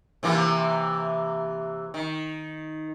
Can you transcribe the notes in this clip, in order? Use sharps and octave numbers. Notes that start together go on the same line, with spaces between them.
C3 E3 A#3
D#3